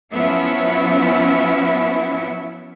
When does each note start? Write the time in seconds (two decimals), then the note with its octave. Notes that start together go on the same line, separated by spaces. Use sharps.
0.12 F3 F#3 B3 C#4 E4 E5